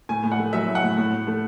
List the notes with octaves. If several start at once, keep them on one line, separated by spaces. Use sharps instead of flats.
A2 G#5
A2
F#5
A3
F#3 E5
A2
F#5
A2
A2
A2
A3